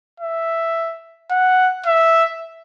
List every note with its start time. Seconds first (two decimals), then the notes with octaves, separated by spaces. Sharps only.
0.20 E5
1.31 F#5
1.86 E5